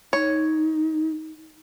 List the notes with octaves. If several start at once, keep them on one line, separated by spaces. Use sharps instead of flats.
D#4 C#5